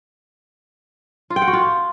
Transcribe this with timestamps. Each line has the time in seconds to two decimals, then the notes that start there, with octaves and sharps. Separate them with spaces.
1.30 F4
1.36 G5
1.42 F#5
1.48 F#4
1.53 F4